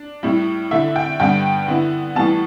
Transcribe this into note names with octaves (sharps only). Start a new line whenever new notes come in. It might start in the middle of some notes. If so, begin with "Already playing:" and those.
Already playing: D4
A2 G3 E4
D3 A3 E4 E5
G5
G2 D3 G3 B3 G5
D3 B3 E4
A2 E3 G3 B3 A5